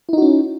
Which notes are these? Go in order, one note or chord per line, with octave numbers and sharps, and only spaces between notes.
C#4 D#4 E4 F#4